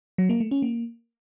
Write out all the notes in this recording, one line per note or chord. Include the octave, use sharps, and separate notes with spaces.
F#3
A#3
A3
C#4
A#3